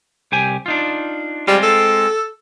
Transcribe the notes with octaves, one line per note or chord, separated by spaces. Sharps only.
C2 G4 G#5
D4 D#4 F4
G3 G#3 C4 F4
A4